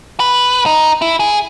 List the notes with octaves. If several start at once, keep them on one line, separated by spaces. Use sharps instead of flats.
B4
D#4
E4
G#4